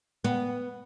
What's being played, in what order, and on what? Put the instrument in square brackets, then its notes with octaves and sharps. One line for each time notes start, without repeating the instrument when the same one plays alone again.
[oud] B3